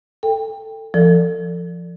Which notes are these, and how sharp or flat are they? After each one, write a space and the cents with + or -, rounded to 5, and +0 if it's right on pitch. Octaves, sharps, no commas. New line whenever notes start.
A4 +15 G5 +20
F3 -25 A4 +30 D5 +0